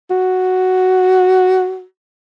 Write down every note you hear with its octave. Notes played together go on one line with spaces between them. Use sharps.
F#4